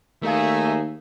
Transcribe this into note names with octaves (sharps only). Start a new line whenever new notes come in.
D#2 A3 D#4 G#4 A#4 E5 F5